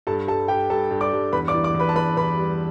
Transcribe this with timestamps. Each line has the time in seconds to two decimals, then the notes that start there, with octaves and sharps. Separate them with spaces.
0.07 G2 A4 A5
0.28 G3 A4 A5
0.48 G3 G4 G5
0.70 G2 A4 A5
0.91 G2
1.01 D5 D6
1.12 G2
1.33 E2 B4 B5
1.48 D5 D6
1.54 E3
1.64 D5 D6
1.74 E2
1.80 B4 B5
1.89 A5
1.96 E2 B4 B5
2.17 E2 B4 B5
2.37 G3